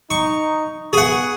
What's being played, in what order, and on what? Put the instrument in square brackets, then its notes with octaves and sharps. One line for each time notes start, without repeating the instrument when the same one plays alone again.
[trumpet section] D#4 [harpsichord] C#6
[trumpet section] B3 C#6 [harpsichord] G#4 F#5